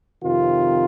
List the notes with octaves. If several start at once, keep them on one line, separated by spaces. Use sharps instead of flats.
F2 C3 D#3 F4